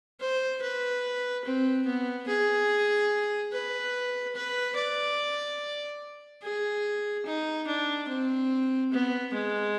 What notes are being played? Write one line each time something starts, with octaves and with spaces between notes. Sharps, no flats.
C5
B4
C4
B3
G#4
B4
B4
D5
G#4
D#4
D4
C4
B3
G#3